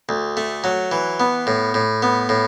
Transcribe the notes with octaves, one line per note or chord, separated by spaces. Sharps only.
D2
A3
F#3
E3
B3
A2
A2
B3
A2